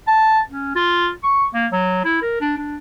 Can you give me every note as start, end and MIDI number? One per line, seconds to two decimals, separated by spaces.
0.08 0.40 81
0.49 0.73 61
0.75 1.11 65
1.24 1.45 85
1.54 1.67 58
1.72 2.02 54
2.05 2.20 64
2.22 2.38 70
2.41 2.54 62
2.58 2.78 62